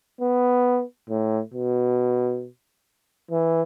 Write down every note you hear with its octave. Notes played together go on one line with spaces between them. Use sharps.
B3
A2
B2
E3